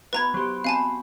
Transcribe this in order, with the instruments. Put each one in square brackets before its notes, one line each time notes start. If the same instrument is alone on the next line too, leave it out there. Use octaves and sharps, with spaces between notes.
[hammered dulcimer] B3 E4 F#4 [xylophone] B4 A#5 G#6
[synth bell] F#3 G4 [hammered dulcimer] C5
[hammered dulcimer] B2 B4 [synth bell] C4 [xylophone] F5 G#5 A5